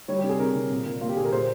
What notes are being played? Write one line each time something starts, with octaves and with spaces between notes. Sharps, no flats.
G3 C#5
G4
C3
G#4
C3 A#4
C3
A#2
A#2
A#3 F4
G4
A#2 G#4
A#4
A#2 C5